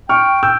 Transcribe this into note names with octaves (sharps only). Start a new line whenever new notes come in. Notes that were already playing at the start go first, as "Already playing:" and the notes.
G5 C#6 F6
G5 E6 G6